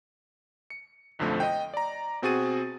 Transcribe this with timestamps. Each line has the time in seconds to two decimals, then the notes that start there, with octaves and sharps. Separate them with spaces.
0.70 C#7
1.19 B1 F2 D3 F3 A3
1.40 D#5 G5
1.74 D5 A#5
2.22 B2 C4 F#4 G#4 A6 D#7